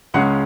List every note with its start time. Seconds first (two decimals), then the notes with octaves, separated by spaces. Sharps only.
0.14 C#2 C#3 G#3 C#4 F#5